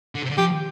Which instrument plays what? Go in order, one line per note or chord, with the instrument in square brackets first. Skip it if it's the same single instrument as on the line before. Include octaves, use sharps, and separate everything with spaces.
[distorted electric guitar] D3
C3
D3
[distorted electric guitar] F3 [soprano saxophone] G4